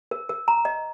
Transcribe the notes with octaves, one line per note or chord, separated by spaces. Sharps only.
A#4
A#4
A#5
D#5